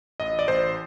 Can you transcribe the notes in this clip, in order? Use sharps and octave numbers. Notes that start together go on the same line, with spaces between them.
A1 D#5
D5
A1 C5